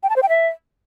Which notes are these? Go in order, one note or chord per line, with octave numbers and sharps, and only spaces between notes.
G5
A5
C5
G5
E5